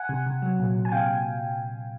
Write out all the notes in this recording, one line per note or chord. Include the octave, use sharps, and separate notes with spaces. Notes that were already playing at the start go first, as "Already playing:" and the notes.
Already playing: F#5 G#5
C3
C3
F#3
A#2
A#2
G#5
C3 F5 G5